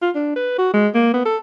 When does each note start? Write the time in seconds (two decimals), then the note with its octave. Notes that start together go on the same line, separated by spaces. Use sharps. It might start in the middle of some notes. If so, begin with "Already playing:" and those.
0.02 F4
0.15 D4
0.36 B4
0.59 F#4
0.74 G#3
0.94 A#3
1.14 B3
1.25 A4